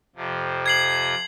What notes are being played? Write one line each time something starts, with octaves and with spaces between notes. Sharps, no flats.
F2 C3 F3
G#6 C7 F#7